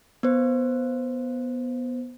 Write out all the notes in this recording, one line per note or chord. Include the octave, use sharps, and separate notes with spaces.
B3 C5